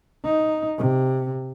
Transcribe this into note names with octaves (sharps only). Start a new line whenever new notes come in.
D#4
C3